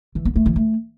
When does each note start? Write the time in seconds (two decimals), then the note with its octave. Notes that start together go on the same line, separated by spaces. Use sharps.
0.15 E3
0.25 B3
0.36 A3
0.46 E3
0.56 A3